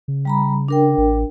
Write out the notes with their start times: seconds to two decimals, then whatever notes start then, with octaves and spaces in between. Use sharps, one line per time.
0.08 C#3
0.25 G3 A#5 B5
0.68 D4 A#4 G5
0.98 A1